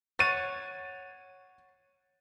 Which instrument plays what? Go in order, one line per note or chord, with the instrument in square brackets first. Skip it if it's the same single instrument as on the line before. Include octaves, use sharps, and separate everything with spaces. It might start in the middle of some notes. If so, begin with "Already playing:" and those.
[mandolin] C#5 F#5 [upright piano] A6 D#7